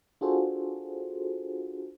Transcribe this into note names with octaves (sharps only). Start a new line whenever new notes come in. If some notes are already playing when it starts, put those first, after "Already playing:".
D4 F4 F#4 G#4 A4 C5